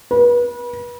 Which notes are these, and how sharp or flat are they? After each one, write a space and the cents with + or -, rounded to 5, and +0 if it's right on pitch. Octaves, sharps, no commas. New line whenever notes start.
B4 -30